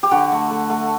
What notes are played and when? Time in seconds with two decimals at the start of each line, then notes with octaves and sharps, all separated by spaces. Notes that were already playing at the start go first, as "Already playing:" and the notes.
0.03 G4
0.11 D3 F#4
0.32 A3
0.51 A3
0.70 A3